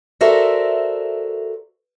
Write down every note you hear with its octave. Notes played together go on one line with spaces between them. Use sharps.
F#4 A4 A#4 C5 D5 E5